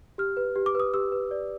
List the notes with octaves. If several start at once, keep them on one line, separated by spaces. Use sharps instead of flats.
G4 F6
B4
G4
D6
B4 D#6
G4 E6
B4
D5